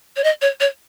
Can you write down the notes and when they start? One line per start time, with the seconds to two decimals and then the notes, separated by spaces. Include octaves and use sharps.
0.16 C#5
0.24 D#5
0.42 C#5
0.60 C#5